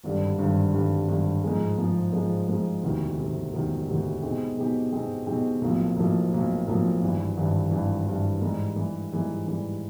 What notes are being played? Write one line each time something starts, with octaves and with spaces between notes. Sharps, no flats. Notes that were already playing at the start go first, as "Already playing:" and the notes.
G#1 G2 D3 G3
G#1 G2 D3 G3
G#1 G2 D3 G3
G#1 G2 D3 G3
G#2 F3 G#3
G#2 F3 G#3
G#2 F3 G#3
G#2 F3 G#3
E1 D2 C3 D#3
E1 D2 C3 D#3
E1 D2 C3 D#3
E1 D2 C3 D#3
B2 G#3 C4 D#4 G4
B2 G#3 C4 D#4 G4
B2 G#3 C4 D#4 G4
B2 G#3 C4 D#4 G4
B1 A2 F3 A#3
B1 A2 F3 A#3
B1 A2 F3 A#3
B1 A2 F3 A#3
G#1 G2 E3
G#1 G2 E3
G#1 G2 E3
G#1 G2 E3
G#2 E3 G3
G#2 E3 G3
G#2 E3 G3
G#2 E3 G3